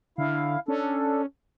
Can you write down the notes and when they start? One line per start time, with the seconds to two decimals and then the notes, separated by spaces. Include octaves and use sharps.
0.18 D3 E4 F5
0.68 C#4 D4 A4